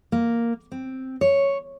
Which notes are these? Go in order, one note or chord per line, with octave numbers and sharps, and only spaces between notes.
A#3
C4
C#5